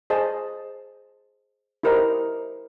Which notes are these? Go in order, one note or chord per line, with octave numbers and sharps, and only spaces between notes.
G#4 C5 D#5 A5
E4 G4 A#4 C5 D#5